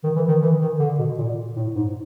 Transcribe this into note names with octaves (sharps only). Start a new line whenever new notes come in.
D#3
E3
D#3
E3
D#3
D3
B2
A#2
A2
G#2